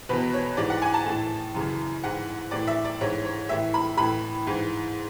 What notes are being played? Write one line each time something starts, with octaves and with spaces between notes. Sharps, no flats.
E2 B2 B4
C#5
G#2 E3 D5
F#5
G#5
A5
A2 E3
F#2 C#3 E3
G#2 E3 F#5
A2 E3 D5
E5
D5
G#2 E3 C#5
C#5
A2 E3 E5
B5
A2 E3 B5
G#2 E3